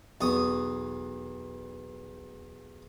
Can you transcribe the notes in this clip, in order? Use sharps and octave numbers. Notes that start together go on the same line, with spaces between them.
B1 E2 C#6 D#6